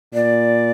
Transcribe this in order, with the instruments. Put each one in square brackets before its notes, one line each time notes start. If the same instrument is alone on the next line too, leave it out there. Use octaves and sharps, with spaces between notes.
[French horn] A#2 [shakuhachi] D5